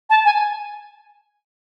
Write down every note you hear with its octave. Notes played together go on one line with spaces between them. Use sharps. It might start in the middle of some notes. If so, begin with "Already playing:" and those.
A5
G#5